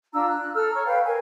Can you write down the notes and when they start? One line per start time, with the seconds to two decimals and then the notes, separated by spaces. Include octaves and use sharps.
0.13 D4 F4 A#5 E6
0.28 F#6
0.54 A4 E6 F6
0.73 C#5 A#5 C#6
0.86 B4 F5 G5
1.05 A#4 G#5